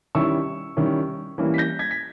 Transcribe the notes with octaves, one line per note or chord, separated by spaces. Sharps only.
D#3 G3 C#4 E4 C#6 E6
D#3 G3 C#4 E4
E3 G3 A#3 C#4 E4
B6
G6 A#6
G#6 B6
B6